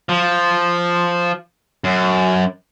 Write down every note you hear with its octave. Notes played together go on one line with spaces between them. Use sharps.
F3
F#2